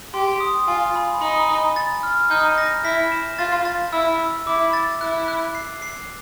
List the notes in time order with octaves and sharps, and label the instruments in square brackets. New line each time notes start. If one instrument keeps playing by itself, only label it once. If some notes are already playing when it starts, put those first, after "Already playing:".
[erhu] G4 [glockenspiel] C6
[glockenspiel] D#6
[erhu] F4 [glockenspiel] G#5
[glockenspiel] B5
[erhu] D#4 [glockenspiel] B5
[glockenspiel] B5
A6
F6
[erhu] D#4 [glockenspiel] G6
[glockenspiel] A#6
[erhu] E4 [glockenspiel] B6
[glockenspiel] E7
[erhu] F4 [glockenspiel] A6
[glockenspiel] A6
[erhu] E4 [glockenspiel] E6
[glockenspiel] E6
[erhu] E4 [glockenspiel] D6
[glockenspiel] A6
[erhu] E4 [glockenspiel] F#6
[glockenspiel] F#6
C7
C7